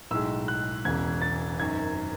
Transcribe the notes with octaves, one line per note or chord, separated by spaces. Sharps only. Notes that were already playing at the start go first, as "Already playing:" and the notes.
B1 A2 G#3 E6
F#6
E1 E2 C#3 G#6
A6
G#1 F#2 D#3 G#6